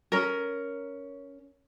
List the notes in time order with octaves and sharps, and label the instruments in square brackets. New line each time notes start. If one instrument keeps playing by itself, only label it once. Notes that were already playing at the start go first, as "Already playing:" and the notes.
[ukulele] C#4 A#4